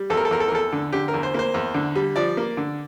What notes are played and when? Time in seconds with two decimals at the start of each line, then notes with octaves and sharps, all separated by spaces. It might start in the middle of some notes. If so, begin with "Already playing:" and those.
Already playing: G3
0.10 E2 A4
0.17 A#4
0.25 A4
0.31 E2 A#4
0.40 A4
0.48 A#4
0.51 E2 A4
0.72 D3
0.92 D3 G4
1.08 A#4
1.14 E2
1.23 C5
1.34 A#3 C5
1.54 E2
1.74 D3
1.95 G3
2.16 F3 D5
2.37 A#3
2.57 D3